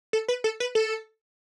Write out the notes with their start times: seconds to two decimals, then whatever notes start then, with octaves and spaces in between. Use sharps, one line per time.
0.13 A4
0.28 B4
0.44 A4
0.60 B4
0.75 A4